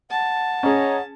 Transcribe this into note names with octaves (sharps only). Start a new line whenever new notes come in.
F#5 A5
C#4 G#4 C#5 D#5 A#5